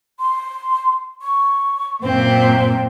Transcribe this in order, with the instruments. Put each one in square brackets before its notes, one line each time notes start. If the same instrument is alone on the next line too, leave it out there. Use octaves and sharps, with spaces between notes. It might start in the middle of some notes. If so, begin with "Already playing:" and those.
[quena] C6
C#6
[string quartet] F#2 A#2 C4 [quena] G5